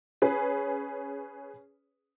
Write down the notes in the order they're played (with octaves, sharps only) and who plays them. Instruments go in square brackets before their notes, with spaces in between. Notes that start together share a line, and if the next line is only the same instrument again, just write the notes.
[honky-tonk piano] C#4 G#4 B4